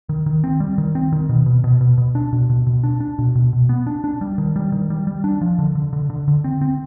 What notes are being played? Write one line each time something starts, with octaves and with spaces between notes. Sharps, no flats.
D#3
D#3
C4
G3
D#3
C4
D#3
B2
B2
B2
B2
B2
D4
B2
B2
B2
D4
D4
B2
B2
B2
B3
D4
D4
G3
D#3
G3
D#3
G3
G3
D4
F3
D3
D3
D3
D3
D3
C4
C4